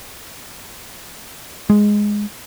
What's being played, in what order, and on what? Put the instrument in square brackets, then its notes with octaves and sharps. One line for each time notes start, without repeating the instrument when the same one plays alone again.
[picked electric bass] G#3